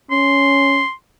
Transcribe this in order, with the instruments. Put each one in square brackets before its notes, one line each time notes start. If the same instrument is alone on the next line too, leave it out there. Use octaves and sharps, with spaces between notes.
[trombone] C#4 [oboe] C6